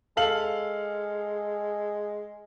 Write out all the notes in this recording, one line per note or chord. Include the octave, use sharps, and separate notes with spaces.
G#3 A4 F5 F#7